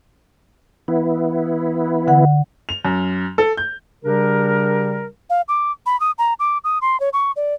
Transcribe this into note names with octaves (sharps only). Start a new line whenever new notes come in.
E3 B3 E4
D3 F#5
F7
F#2
A4
G6
C#3 G3 D4 G4 A#4
F5
D6
B5
D#6
A#5
D6
D#6
C6
C#5
C#6
D5